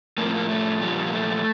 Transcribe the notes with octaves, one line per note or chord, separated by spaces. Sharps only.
A2 F3 A#3
C4
A#3
A3
A#2 F3 G3
A#3
A3